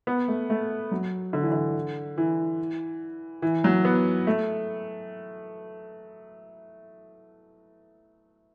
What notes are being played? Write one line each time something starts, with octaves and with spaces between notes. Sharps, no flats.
B3
A3
A3
F#3
D3
E3
D3
E3
E3
F#3
B3
A3